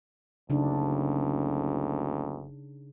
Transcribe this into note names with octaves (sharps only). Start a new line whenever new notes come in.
F#1 D2 C#3 D4 D#4